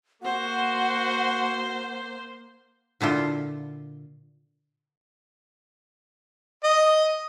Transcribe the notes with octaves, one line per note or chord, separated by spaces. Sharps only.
A#3 F#4 C5 F#5
A#2 D3 E4 F4
D#5